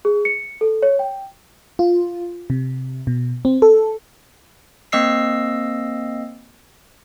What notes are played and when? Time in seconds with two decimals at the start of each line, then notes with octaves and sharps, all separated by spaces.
0.05 G#4
0.25 C#7
0.61 A4
0.82 C#5
0.99 G5
1.79 F4
2.50 C3
3.07 B2
3.45 C4
3.62 A4
4.92 A#3 C4 D#5 E6 C7